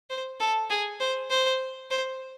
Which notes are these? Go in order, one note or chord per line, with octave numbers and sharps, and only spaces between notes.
C5
A4
G#4
C5
C5
C5